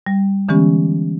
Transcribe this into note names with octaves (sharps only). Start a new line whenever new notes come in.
G3
D3 E3 G#3 B3 C#4 G4